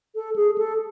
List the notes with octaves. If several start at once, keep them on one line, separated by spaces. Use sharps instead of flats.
A4
G#4
A4